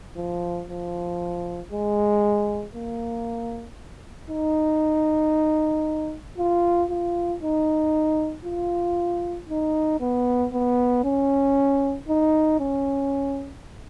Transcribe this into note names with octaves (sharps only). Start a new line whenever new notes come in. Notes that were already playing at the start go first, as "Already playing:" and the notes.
F3
F3
G#3
A#3
D#4
F4
F4
D#4
F4
D#4
B3
B3
C#4
D#4
C#4